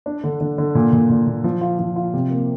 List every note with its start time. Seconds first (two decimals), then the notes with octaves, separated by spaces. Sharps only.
0.06 D4
0.24 D3
0.40 D3
0.58 D3
0.75 A#2
0.93 A#2
1.09 A#2
1.27 A#2
1.44 F3
1.61 F4
1.79 F3
1.96 F4
2.14 C3
2.30 A#3